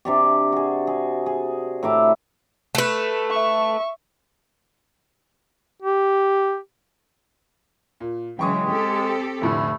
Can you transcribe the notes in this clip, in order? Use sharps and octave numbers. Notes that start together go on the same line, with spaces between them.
C3 D4 G4
F#4 G#4
G#4
G#4
A2 E5 A#5 D6
A3 B4
E5 C#6
G4
A#2
C#3 E3 F#3 G#3 G5 C#6 D#6
C4 G4 A4
F1 A2 D3 A3